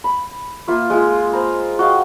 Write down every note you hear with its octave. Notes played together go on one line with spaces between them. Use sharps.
B5
A#3 F4 E5
G#3 F4
C5 A#5 B5
F#4 D#5 F5 G5